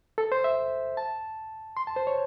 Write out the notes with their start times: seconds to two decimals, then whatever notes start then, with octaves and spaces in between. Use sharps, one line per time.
0.18 A4
0.32 C5
0.44 E5
0.97 A5
1.77 C6
1.87 A5
1.96 C5
2.07 C#5